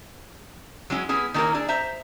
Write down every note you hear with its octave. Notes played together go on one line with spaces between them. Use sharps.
F#3 G#3 C#4 E4
B3 C#4 E4 G#4
D#3 A#3 C#4 D#4 E4 A#4
D4 E4 G#4
C5 E5 A#5